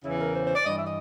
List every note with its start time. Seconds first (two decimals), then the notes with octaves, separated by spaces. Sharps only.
0.04 E2 C#3 E3 E4
0.20 A#4
0.34 C5
0.45 C5
0.55 D5
0.65 G2 E3 D#5
0.75 E5
0.85 D#5